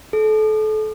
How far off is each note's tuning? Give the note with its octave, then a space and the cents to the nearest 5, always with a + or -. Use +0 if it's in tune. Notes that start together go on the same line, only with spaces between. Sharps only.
A4 -30